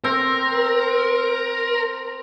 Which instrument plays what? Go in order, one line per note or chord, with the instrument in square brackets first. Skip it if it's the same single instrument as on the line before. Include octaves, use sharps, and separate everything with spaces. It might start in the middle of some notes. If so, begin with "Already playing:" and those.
[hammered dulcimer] C4 [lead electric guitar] A#4